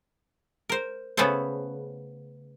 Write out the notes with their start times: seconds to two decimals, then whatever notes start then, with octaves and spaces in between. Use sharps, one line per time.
0.69 A#4 C5
1.17 C#3 A3 B3 G#4 A4 C5